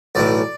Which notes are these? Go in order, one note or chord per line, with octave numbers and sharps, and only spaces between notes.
B1 A2 E3 D5